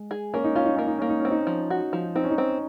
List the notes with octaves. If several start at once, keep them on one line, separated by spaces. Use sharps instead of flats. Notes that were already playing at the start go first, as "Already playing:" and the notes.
Already playing: G#3
G#4
A#3 C#4
D#4
C#4 F4
D#4
A#3 C#4
D#4
A#3 C#4
D#4
C#4
C4
D#4
C#4
F3
F#4
F3
C4 D#4
C#4
D#4
C4